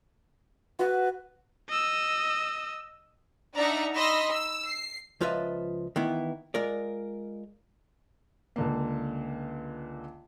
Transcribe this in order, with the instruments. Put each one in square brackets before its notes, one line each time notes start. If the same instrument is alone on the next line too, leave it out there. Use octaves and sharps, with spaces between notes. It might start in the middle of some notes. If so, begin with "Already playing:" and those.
[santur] F#4 [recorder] B4
[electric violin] D#5 E6
[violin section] D4 D#4 D5 E5 F#5 A#5
D#4 D#5 B5 C6 E6 A#6
E6
C7
[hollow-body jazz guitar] C#2 F3 F4 B4 D#5 E5
D#3 E3 B3 E4
G#3 F4 A#4 D5
[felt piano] C#2 D3 A#3